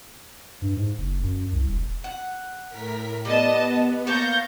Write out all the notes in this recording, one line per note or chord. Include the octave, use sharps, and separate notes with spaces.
G2
G#2
F#1
F#2
C2
E1
F#5
A2 A#4 B6
G3 B3 D#5 A5
A#3 C#5 F5 A5 C#6 G6 A#6